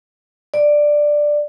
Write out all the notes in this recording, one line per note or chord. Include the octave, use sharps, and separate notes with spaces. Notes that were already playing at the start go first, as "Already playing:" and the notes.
D5